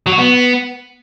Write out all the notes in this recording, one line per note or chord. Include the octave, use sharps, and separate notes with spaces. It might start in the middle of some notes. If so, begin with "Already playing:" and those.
F#3
F#4
B3